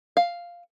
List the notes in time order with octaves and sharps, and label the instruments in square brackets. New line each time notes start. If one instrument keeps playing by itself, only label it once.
[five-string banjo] F5